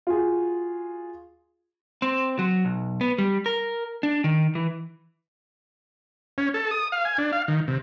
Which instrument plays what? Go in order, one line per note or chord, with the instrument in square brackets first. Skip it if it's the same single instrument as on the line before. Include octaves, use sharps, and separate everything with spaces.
[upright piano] F4 F#4 G#4
[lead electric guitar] C4
F#3
B1
B3
G3
A#4
D4
D#3
E3
[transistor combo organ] C#4
A4
D#6
F5
G#5
D4
F5
D#3
C3